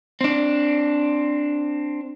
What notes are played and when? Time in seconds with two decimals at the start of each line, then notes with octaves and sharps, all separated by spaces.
0.21 C4 D4